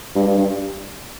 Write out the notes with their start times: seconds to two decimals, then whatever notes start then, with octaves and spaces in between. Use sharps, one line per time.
0.15 G2
0.27 G2
0.38 G2